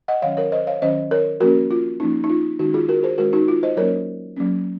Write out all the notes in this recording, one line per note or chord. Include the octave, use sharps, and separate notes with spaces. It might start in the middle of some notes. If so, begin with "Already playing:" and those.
D#5 F#5
D#3 F#3 C#4 C#5 F5
A#4 C#5
C5 D#5
C#5 F5
D#3 F#3 C#4 C5 D#5
A#4 C#5
F3 A#3 C#4 F#4 A#4
F4
F3 A#3 C#4 D#4
D#4
F4
D#3 G#3 C#4 D#4 F#4
F4 G#4
F#4 A#4
G#4 C5
D#3 G#3 C#4 F#4 A#4
D#4 F#4
F4
C5 D#5
F#3 A#3 C#4 A#4 C#5
F#3 A#3 C#4